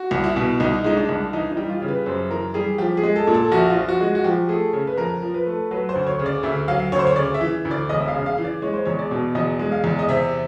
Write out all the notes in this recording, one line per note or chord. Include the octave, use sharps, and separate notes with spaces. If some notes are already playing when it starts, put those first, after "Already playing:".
Already playing: F#4
C2
E4
B2
C2 D#4
G#3 D#4
D4
C2
E3 D#4
D#4
G3
F4
C#3
B4
F#2 C5
E3 A#4
G3 G#4
F3 G4
G#4
G#3
A4
A#2
A4
A#1 F#4
F4
F3
F#4
G#3
F#4
F3 G4
A3 G#4
C#3
B4
F2 A#4
F3
B4
A3
F#3 B4
C5
D2
C#5
C#3
D5
D2 E5
F#3 F5
D2 C#5
C5
C#5
C#3 D5
E5
E3
D2
D5
E1 D#5
E5
F5
C#3
F5
E3
D5
G#3 C#5
C5
E2 C#5
D5
B2
E2 D#5
G#3
F5
E2
D#5
C3 E5